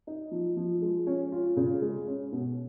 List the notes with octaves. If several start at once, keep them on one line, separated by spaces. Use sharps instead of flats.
D#4
F3
F3
G#3
C#4
F4
C#3
G#3
C#4
B2